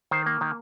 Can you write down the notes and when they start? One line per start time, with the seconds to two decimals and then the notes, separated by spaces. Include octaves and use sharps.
0.11 D#3 C5
0.26 A#3
0.41 D#3